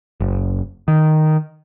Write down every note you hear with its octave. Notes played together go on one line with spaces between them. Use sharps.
F#1
D#3